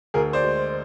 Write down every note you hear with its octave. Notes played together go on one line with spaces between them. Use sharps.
D2 G#4 A#4
C5 D5
G#3